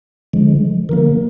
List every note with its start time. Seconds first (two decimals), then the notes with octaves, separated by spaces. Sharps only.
0.33 D3 F3 G#3
0.89 D3 F3 A#3 A#4